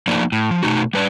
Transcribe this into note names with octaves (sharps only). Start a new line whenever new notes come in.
F3 A3 A#3 D#4 D5
A2
F3
B2 A3 D#4 F#4
G3 B4 D5